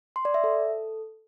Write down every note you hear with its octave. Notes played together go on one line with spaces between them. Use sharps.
C6
D5
E5
A4